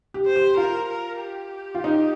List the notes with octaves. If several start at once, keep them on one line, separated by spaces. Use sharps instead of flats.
G4
C5
G4
F4 A#4
A#4
G4
F4
D#4